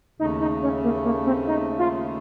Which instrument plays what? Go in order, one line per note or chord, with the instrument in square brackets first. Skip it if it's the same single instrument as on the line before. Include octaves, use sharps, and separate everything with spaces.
[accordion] D#2 C#3 A3 [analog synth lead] D#4
[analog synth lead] D#4
C#4
A#3
A#3
C4
D#4
F4